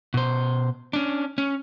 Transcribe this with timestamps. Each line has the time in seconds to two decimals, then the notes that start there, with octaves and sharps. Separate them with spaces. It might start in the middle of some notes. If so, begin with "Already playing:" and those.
0.14 B2 C5
0.93 C#4 D4
1.38 C#4